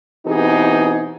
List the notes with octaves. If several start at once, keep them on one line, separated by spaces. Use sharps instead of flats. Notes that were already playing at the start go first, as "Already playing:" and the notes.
B2 E3 C4 D#4 G4 G#4